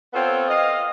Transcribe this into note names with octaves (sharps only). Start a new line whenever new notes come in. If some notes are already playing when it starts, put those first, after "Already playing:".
B3 C4 F4 A4 C#5
D#5 F5